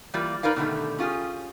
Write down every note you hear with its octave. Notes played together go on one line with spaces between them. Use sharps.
E3 G3 A#3 F4 D5
D#4 A#4 B4 D5 F5
B2 D3 D#3 G3 A3
C#4 F4 G4 G#4